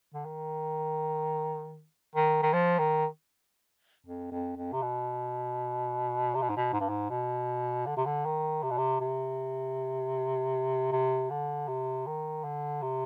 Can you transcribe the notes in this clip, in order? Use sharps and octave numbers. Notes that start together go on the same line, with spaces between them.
D3
D#3
D#3
D#3
F3
D#3
F2
F2
F2
C3
B2
C3
B2
G#2
B2
G#2
G2
G#2
B2
D3
C3
D3
D#3
C3
B2
C3
C3
C3
D3
C3
D#3
D3
C3